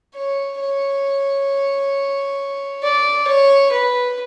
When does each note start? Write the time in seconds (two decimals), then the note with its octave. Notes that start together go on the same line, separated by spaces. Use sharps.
0.15 C#5
0.60 C#5
2.83 D5
3.28 C#5
3.72 B4